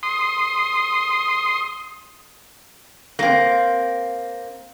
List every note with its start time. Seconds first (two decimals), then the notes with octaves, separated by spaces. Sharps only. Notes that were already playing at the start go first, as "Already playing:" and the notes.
0.03 C6 D#6
3.19 A#3 C4